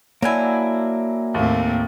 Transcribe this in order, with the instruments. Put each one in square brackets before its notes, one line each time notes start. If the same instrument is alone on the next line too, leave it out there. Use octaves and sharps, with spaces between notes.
[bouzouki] F#3 D4 E4 [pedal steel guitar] A#3 G#5
[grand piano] D#2 [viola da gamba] A2 A3 C4